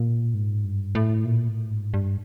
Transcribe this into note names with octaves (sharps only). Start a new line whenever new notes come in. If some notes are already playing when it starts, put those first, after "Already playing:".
Already playing: A#2
G#2
G2
A2
A#2
A2
G#2
G2